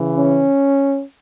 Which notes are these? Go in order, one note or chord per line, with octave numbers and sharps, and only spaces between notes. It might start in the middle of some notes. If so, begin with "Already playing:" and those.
Already playing: C#3 E3
C#4